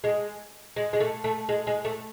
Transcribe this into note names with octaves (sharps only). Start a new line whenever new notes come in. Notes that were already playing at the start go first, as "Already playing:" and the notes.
G#3
G#3
G#3
A3
A3
G#3
G#3
A3